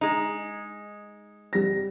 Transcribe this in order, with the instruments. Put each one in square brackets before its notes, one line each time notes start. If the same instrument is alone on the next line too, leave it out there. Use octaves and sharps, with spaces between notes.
[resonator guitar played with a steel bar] G#3 D#4
[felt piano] G3 A#6